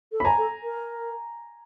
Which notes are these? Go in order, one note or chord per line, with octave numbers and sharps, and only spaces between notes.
A4
B5
G#5 A#5
A4
A#4